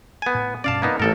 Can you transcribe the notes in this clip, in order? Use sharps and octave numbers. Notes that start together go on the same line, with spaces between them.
B3 G#5
A2
G2 B2 C#4 D5 F5 A5
A#3 B3 D#4
A1 G#2 A3 C#4 A4 A#4